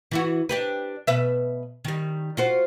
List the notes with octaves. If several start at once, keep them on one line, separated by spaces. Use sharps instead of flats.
E3 E4 F#4
D4 G4 B4
B2 B4 E5
D#3 G3
F4 F#4 C5